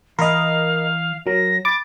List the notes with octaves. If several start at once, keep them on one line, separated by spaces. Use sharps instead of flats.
E3 A#4 D#5 F5 B5 C6
F#3 A#4 A#6
B5 D6 A6